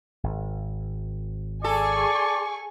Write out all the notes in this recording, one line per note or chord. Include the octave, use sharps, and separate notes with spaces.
G#1
G#4 A4 D5 G#5 C#6